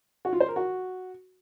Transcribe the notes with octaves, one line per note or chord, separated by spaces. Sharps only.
F#4
F4
C5
A#4
F#4